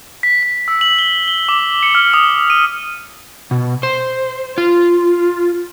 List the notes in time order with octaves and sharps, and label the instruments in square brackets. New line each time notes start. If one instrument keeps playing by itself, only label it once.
[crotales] B6
B6
E6
F#7
G7
G7
D6
C#7
F6
D#6
D#7
[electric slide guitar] B2
C5
F4